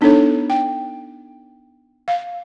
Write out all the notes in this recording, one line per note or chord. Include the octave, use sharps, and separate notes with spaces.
B3 D4 D#4 A4 C#5
G5
F5